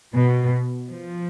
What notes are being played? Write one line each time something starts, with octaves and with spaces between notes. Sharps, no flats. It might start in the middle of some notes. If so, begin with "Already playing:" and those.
B2
F3